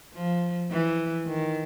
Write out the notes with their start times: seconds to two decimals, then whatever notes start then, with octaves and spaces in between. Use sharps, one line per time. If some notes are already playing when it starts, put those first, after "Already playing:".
0.14 F3
0.71 E3
1.27 D#3